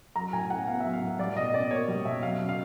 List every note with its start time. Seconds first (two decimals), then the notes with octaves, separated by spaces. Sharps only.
0.16 F#3 A#5
0.33 A2 G#5
0.50 A2 F#5
0.67 B3 F5
0.80 E5
0.85 F#3
0.93 F5
1.02 A2
1.19 G3 D5
1.36 B2 D#5
1.54 B2 D5
1.71 A#3 C#5
1.88 G3
2.05 B2 E5
2.23 F#3 F5
2.40 C#3
2.49 F5